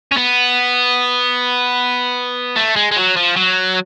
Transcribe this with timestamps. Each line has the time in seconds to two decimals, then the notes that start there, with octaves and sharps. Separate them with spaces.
0.11 C#4
0.17 B3
2.56 A3
2.76 G#3
2.92 G#3
2.97 F#3
3.17 F3
3.36 F#3